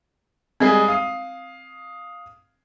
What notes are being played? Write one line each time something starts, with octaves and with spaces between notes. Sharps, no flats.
G3 G#3 C4 G#4
F5 D#6